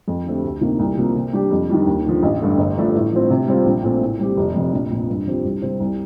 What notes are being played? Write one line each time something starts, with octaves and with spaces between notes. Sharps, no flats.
F2
D3 A3 C4 G4
D2
C3 D#3 A#3
C2
C3 F3 A#3
C3
G3 D4 G4
F2
D#3 G3 D4
D#2
D3 F3
A1
G2 D3 A3
G1
G2 F3 A3 D4
A2
F3 C4
C3
G3 C4 F4
A#1
A#2 A3 C4
A2
G3 C4 G4
F1
F2 C3
A#1
A#2 F3
G2
F3 C4 G4
C2
C3 G3 C4
C2